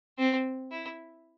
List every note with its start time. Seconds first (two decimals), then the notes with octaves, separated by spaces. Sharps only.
0.18 C4
0.71 E4